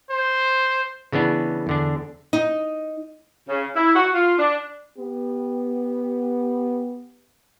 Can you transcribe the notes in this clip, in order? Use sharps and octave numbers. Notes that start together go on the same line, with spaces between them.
C5
C#3 E3 B3 D4
E2 D3 D4
D#4
C#3
E4
F#4
F4
D4
B3 G4